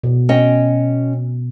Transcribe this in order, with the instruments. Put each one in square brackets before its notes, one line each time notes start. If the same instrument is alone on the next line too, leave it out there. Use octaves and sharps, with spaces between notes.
[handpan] B2
[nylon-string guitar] C#4 D#5 G5